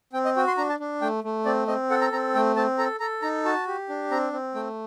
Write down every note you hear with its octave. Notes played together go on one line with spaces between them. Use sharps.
C4 G5
D#5
F#4 G5
C6
D4 A#5
A5
D4
A3 G5
A3
C4 D5
C4 D#5
A4 F#5
A#5
C4 A#5
A3 G5
C4 A5
A4 A#5
A4 A#5
D#4 A#5
F#4 A5
G4
D4
C4 A#5
C4
A3 G5